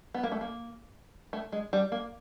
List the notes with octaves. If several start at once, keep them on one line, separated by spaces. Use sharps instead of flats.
B3
A#3
A3
A#3
A3
G#3
G3
A#3